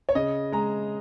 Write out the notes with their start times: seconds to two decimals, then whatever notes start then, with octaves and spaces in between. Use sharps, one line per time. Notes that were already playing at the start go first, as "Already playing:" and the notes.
0.09 C#5
0.15 C#3 D#5
0.52 G#3 A#5